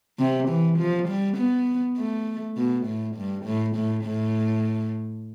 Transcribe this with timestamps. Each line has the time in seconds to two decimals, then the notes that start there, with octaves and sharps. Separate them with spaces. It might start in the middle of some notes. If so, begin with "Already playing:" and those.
0.19 C3
0.48 E3
0.78 F3
1.08 G3
1.37 B3
1.98 A3
2.57 B2
2.86 A2
3.16 G2
3.45 A2
3.76 A2
4.04 A2